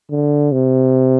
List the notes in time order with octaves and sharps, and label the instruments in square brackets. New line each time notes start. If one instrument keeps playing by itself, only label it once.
[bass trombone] D3
C3